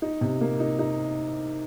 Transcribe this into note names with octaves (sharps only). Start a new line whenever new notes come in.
D#4
C3
A#3
D#4
D#4